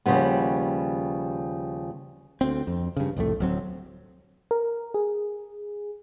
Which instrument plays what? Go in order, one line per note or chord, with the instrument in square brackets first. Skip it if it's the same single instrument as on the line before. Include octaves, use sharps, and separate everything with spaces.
[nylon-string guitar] D#2 C#3 F3 G3 B3
[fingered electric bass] D2 C4
F2
G2 C#3
C2 F2 A2 A3
D1 F#3 C4
[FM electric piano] A#4
G#4